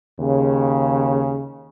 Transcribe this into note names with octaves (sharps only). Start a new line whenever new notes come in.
D#2 C#3